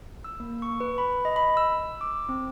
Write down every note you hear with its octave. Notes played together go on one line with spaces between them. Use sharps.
E6
A#3
C#6
B4
B5
D#5
B5
E6
D6
C4